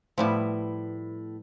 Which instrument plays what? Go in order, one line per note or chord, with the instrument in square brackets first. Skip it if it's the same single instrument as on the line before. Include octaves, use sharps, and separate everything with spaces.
[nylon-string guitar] A2 E4 [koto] F3 G3 B3